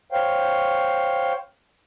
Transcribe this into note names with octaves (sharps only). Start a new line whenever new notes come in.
C5 C#5 F5 G5